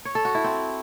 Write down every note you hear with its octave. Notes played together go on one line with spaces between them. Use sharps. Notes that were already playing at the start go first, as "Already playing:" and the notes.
C#5
A4
F#4
E4
C4